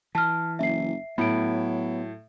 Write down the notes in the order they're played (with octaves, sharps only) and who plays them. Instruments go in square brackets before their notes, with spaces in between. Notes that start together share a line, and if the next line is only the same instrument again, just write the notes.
[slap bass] E3 [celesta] A5 F6
[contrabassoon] F#1 [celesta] E5 C7
[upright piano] A2 [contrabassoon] F#3 [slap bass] B3 [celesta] B5 D7